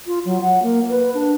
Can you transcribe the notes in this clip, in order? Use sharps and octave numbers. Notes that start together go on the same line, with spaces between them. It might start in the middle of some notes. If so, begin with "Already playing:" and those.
F4
F#3
F#5
A#3
B4
D4